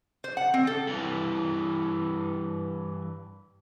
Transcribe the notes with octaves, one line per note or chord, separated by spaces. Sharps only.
C5
F#5
C4
A4
G2 E3